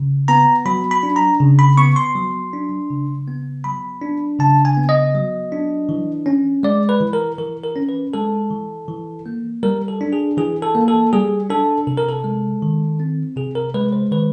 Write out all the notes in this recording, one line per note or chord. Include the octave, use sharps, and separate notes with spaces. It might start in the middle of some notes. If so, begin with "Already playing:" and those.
Already playing: C#3
B3 A#5
F#3 B5
B5
D4
A#5
C#3
B5
B3 C#6
C6
F#3
D4
C#3
B3
F#3 B5
D4
C#3 A5
G#5
B3
D#5
F#3
D4
E3
C#4
G#3 D5
B4
E3
A#4
E3 A#4
A#4
C#4
B4
G#3 A4
E3
E3
A#3
G3 A#4
A4
D4
G#4
E3 G#4
A4
A#3
A4
G3 G#4
D4 A4
C3 A4
A#4
A4
G#3
D#3
C4
C3 G#4
A#4
G#3 B4
C5
D#3 B4